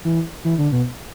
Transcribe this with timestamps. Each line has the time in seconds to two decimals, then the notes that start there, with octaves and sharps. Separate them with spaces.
0.05 E3
0.44 E3
0.58 D3
0.72 B2